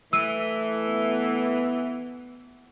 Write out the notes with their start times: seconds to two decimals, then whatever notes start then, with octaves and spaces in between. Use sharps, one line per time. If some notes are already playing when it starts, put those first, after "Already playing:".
0.13 E3 A3 E6 D#7
0.88 B3